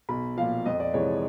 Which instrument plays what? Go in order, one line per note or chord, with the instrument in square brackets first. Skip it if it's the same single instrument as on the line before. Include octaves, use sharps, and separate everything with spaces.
[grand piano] B1 B5
A#2 F3 F5
F2 D#5
D5
C3 E3 G#3 C#5